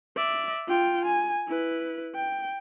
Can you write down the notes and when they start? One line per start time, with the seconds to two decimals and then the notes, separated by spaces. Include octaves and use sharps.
0.16 D5 E5
0.67 F4 G5
1.05 G#5
1.48 E4 B4
2.15 G5